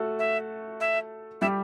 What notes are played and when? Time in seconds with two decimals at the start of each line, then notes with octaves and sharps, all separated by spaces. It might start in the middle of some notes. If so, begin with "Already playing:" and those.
Already playing: A3 F#4 A4
0.19 E5
0.80 E5
1.41 G3 G4 E5